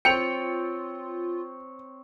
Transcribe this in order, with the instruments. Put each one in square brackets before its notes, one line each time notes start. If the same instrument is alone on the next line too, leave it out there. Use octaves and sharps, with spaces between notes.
[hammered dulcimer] C4 C#5 [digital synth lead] F4 [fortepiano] G5 [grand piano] C#7 F7